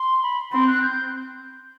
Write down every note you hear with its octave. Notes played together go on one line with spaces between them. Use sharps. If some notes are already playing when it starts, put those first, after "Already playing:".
Already playing: C6
B5
C4 C6
F#6
G6